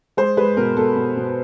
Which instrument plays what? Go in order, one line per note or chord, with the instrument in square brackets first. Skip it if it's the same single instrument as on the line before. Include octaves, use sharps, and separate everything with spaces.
[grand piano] G#3 C5
G#3 B4
B2 A#4
B2 A4
B2
B2